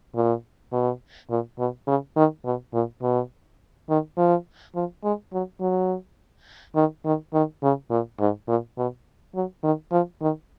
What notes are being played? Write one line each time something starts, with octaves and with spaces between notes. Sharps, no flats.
A#2
B2
A#2
B2
C#3
D#3
B2
A#2
B2
D#3
F3
F3
G#3
F#3
F#3
D#3
D#3
D#3
C#3
A#2
G#2
A#2
B2
F#3
D#3
F3
D#3